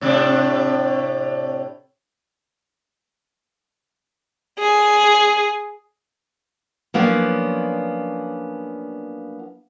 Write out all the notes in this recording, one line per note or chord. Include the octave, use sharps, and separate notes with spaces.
A2 C3 D4
G#4
F3 F#3 A#3 B3 C#4 D4